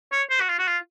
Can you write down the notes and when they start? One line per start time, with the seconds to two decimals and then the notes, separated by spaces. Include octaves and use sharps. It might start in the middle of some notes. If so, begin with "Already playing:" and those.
0.12 C#5
0.30 C5
0.40 F#4
0.49 F4
0.59 F#4
0.68 F4